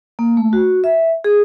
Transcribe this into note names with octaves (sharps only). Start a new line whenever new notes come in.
A#3
A3
F#4
E5
G#4